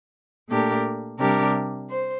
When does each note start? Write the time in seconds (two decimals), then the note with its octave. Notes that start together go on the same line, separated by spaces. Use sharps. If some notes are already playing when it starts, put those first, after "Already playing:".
0.49 A#2 A3 D4 G4 A#4
1.19 C3 G3 D4 G4 A#4
1.90 C5